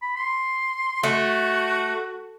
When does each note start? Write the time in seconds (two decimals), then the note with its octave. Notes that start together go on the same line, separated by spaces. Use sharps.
0.02 B5
0.16 C6
1.03 A3 F#4